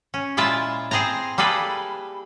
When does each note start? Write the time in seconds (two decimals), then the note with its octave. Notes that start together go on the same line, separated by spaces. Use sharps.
0.14 C#4
0.37 A#2 G#3 E4 F4 E5 A5
0.91 C4 G#4 C5 A5 A#5
1.38 G3 A#3 G#4 A4 B4